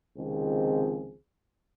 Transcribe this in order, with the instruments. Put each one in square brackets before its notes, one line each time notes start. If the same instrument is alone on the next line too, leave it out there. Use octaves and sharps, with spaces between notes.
[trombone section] C#2 C3 D#3 F3 C4 G#4